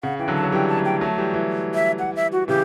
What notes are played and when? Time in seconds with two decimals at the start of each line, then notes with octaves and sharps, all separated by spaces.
0.03 C#3 F#5
0.19 E3 G5
0.28 D3 F#3
0.36 A5
0.43 F#3
0.52 E3 G3 G5
0.68 A5
0.77 F#3 A3
0.85 G5
1.01 F#3 A3 A5
1.18 E3 G3
1.34 E3 G3
1.74 E5
1.99 F#5
2.16 E5
2.32 F#4
2.48 C#3 E3 G4